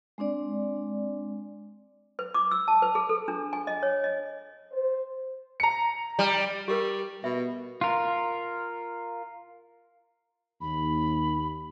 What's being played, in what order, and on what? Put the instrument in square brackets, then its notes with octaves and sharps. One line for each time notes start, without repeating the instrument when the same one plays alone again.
[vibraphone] G#3 C4 D4 D5
[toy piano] B4
D6
E6
A5
B4
G#4
A4
D4
G#5
D#5
C#5
D#5
[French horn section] C5
[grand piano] A#5 C#7
[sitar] G3
[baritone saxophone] G3 [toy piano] G4 A#4 B4
[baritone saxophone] B2 [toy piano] E5
[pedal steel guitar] F4 A#4
[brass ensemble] D#2 [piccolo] B5